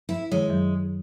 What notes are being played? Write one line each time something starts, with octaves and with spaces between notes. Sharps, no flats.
E4
D#3 G#3 C#5
F#2 F#3